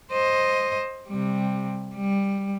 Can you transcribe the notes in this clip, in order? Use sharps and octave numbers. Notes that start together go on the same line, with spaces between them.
C5 D#5
C3 G3
G3